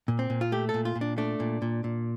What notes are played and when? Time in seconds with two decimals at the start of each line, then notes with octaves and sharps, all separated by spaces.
0.08 A#2
0.19 C4
0.30 A#2
0.41 F4
0.52 A3 G4
0.69 A4
0.74 A#2
0.85 F4
0.95 A#2
1.01 D4
1.18 A3 D4
1.40 A#2
1.62 A#2
1.84 A#2